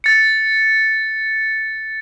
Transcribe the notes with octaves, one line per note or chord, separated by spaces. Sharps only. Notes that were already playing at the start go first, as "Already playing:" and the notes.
A6 C#7